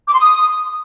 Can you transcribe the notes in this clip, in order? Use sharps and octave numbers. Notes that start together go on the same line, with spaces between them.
D6
C6
D#6